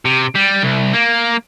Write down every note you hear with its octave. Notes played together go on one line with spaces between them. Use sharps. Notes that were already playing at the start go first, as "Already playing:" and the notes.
C3
G3
C2
A#3